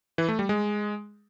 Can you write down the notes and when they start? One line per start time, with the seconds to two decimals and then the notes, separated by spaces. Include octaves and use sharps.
0.18 E3
0.28 A3
0.39 G3
0.49 G#3